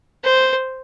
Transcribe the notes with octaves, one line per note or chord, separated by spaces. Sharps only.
C5